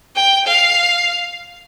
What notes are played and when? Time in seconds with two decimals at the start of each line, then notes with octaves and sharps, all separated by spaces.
0.16 G5
0.47 F5